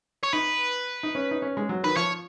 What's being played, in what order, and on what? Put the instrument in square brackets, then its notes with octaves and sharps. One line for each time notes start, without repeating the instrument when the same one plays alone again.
[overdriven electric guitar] C#5
[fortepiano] D#4 [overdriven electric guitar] B4
[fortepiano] D#4
C#4
D#4
C#4
G#3
F#3
[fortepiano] D#3 [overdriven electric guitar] B4
[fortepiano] F3 [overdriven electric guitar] C#5